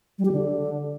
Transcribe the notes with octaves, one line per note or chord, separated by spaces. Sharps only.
G3
G4
D3